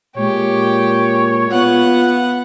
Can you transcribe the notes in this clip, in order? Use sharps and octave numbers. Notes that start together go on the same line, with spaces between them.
A#2 G#3 G4 C#5
B3 F4 F#5